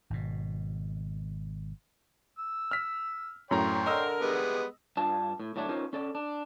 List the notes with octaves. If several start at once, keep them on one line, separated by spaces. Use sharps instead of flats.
G#1 B2
E6
F6 B6
F#2 A2 C#5 G5 A#5 C6
D3 A#4 D#5 E6
G3 G#3 B3
G2 D4 F4 A5
A2
A2 F#3 A3 D4
C#4 D#4 F4 A#4 C5 C#5
C#4 A4 D5
D4